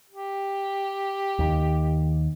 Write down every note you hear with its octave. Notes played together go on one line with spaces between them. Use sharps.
G4
D#2 D#3